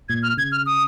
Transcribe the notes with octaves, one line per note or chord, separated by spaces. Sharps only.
A#2 G#6
F6
C#3 G#6
F6
D#6